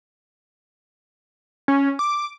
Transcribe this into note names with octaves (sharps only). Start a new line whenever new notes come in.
C#4
D6